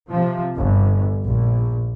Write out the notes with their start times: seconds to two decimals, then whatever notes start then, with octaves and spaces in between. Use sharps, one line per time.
0.11 C3 F3
0.56 G1
1.25 A#1